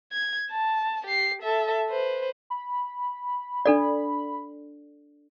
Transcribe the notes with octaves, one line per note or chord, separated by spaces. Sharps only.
G#6
A5
G4 C7
A4 E5
B4 C5
B5
D4 A4 D5